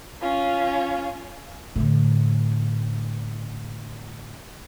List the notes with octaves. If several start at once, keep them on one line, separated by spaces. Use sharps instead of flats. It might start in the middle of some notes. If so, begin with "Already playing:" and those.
C#4 F4
A2 D3